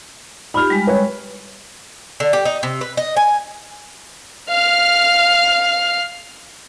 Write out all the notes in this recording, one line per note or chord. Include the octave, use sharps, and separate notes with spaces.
D#4 F4 G4 B5 F6
G3 G#3
B4 C#5
D3
G4
D#4
C3
B4
D#5
G#5
F5 F6